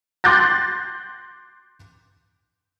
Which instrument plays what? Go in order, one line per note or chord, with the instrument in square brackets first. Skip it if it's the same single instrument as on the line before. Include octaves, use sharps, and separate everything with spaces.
[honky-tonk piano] C6 D6 F#6 G6 A6 A#6